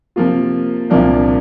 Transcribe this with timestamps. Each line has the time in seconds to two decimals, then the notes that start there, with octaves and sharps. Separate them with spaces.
0.16 C3 F3 A#3 F4
0.90 C2 A#2 F3 A#3 D4